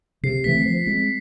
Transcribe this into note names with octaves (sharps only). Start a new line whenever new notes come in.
C3 C7
E3 A3 C4 B6
F3
G#3 C4